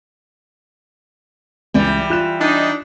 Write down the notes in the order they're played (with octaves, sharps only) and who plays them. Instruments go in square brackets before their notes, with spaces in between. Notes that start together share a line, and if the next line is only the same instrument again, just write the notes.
[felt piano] C#2 [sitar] E3 G3
[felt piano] F4 F#6 E7
[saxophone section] D4 D#4